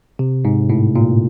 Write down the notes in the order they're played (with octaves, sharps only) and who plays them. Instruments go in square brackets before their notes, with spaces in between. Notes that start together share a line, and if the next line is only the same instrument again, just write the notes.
[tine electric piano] C3
G#2
A2
A#2